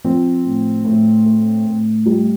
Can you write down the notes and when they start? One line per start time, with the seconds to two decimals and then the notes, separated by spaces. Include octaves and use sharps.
0.04 F3 C4
0.45 A2
0.85 A2
1.25 A3
1.65 A2
2.06 G3